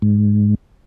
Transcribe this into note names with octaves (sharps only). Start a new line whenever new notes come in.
G#2